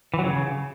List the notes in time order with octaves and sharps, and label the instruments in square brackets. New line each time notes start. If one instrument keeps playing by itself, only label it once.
[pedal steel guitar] E3
F#3
C#3